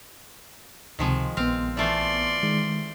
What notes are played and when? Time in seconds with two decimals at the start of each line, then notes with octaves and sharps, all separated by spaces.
0.99 C#2 C3 D#3 F3 G#3
1.37 A#1 B3 C4 F5
1.77 E3 A3 F4 D5 C6
2.43 D#3 G#3